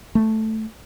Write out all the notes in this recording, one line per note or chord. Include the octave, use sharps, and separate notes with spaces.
A3